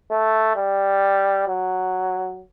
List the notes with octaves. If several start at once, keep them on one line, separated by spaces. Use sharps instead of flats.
A3
G3
F#3